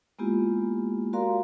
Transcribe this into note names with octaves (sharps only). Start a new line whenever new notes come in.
G#3 A#3 B3 E4 F4 G4
F#4 A#4 D5 F5 A#5 C6